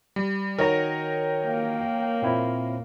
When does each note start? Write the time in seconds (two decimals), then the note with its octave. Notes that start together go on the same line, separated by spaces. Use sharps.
0.16 G3
0.58 D#3 F#4 A#4 C#5 D#5 G5 A#5
1.46 A#3
2.22 A#2 C4 E4